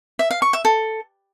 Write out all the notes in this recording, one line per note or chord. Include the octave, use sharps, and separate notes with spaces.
E5
F5
C#6
E5
A4